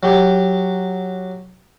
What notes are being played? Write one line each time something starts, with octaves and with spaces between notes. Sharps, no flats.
F#3 G4